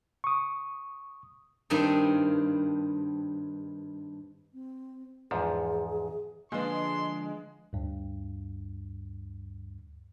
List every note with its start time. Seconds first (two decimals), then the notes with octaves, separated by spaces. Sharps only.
0.24 C#6 D#6
1.70 G2 D#3 C4 D4 D#4
4.54 C4
5.31 E2 G#2 F3 G#4
6.52 D3 F3 G#3 A#3 D4 B4 C6
7.73 D2 G2